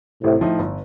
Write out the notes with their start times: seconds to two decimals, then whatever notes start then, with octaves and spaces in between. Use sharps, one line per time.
0.23 A1 A2 C3
0.41 A2 F3 A3 D#4
0.59 G1